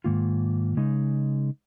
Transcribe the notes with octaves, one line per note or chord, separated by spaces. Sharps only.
G#2 D#3 A#3 F4
C#3 G#3 D#4